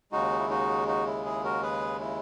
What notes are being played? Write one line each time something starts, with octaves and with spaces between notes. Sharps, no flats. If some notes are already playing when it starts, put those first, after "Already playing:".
D#2 C#3 G#3 D#4 F#4
E4
D#4 F#4
D#4 F#4
E4
E4 G#4
F#4 A#4
G#4 B4
E4